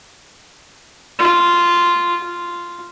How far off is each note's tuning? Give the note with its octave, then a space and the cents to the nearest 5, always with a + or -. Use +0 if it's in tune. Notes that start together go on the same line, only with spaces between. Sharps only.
F4 -5
F4 -5